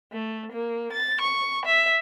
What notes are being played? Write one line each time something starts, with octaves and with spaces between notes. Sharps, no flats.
A3
A#3
A6
C#6
E5